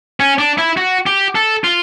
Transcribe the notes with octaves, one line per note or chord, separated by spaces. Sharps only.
C#4
D4
E4
F#4
G4
A4
F4